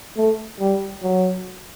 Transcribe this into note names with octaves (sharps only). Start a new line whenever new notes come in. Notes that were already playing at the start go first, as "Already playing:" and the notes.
A3
G3
F#3